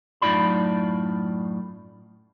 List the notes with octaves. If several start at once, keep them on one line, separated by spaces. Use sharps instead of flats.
F#2 A2 D#4 F4 D5 B5